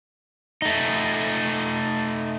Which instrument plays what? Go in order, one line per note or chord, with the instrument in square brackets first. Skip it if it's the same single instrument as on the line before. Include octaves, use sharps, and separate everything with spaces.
[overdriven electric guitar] A3 D#4